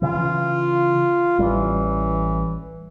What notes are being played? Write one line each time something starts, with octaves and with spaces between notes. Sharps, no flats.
C#3 E3 F4
A1 E3 G3